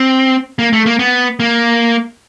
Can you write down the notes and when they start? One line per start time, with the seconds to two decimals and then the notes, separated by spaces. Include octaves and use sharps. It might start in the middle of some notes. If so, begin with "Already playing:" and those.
Already playing: C4
0.59 A#3
0.73 A3
0.86 A#3
0.99 B3
1.40 A#3